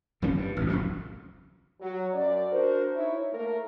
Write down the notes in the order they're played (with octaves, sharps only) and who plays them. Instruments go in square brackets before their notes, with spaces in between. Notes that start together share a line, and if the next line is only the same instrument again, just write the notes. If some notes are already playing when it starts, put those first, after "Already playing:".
[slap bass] F#1 D#3 F3 C#4
G2
A1 D2
E1 A#1 F#2 F3
[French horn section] F#3
F#2 D5
D4 F#4 A#4 C5
D#4 E4 C#5
A3 A#3 A#4